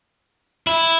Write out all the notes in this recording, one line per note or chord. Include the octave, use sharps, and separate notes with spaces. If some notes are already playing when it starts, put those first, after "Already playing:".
E4